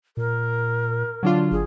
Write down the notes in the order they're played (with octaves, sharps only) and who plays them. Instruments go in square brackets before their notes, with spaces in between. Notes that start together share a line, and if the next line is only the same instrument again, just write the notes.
[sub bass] A#2 [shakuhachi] A#4
[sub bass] D3 [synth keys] F#3 D4 F4
[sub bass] G1 [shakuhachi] G#4